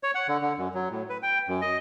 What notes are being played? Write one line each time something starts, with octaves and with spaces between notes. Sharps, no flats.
C#5
F#5
D3
D3
F#2
F#3
A2
B4
G5
F#2
D#5